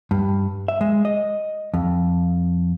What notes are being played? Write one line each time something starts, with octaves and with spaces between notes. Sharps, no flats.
G2
E5
G#3
D#5
F2